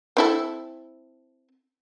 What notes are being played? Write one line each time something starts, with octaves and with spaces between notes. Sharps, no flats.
C4 E4 A4